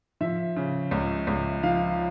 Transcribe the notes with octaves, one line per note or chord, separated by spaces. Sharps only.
F3 E5
C#3
C#2
C#2
F3 F5